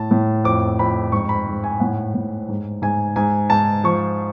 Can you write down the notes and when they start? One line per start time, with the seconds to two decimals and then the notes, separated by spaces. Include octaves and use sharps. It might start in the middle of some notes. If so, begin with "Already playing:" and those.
Already playing: A2 A5
0.11 A2
0.44 F2 D6
0.79 F2 B5
1.12 G#2 C#6
1.29 B5
1.47 G#2
1.64 G#5
1.80 A2 F#5
2.14 A2
2.49 G#2
2.82 G#2 G#5
3.16 G#2 G#5
3.50 G#2 A5
3.84 F3 C#6